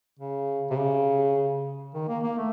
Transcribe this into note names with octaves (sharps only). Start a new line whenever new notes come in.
C#3
C3
C#3
D#3
A#3
A#3
A3